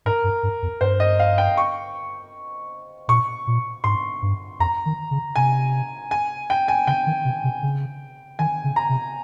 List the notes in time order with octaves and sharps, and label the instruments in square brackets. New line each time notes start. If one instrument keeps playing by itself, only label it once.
[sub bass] G#2 [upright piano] A#4
[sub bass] G2
G2
F2
[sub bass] G2 [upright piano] C5
[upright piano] D#5
F5
G5
C#6
[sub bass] A#2 [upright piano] C#6
[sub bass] A#2
[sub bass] G#2 [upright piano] C6
[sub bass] G2
[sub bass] F2 [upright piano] A#5
[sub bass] D#3
C#3
[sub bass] C3 [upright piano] G#5
[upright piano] G#5
G5
G#5
[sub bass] C#3 [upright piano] G5
[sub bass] D#3
C3
C3
C#3
[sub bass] D#3 [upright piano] G#5
[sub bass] C#3
[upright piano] A#5
[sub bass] C3